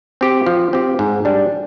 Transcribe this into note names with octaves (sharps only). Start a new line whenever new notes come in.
C4 G4
F3
C4 G4
G#2
G3 D4